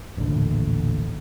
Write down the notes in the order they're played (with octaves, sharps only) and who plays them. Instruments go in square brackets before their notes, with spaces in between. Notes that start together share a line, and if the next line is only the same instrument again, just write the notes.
[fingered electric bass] D#1 A1 A#2 D3